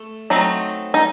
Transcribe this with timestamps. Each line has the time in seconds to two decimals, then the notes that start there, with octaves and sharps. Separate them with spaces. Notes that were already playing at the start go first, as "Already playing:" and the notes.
Already playing: A3
0.30 F#3 A3 C4 D#4
0.94 D#4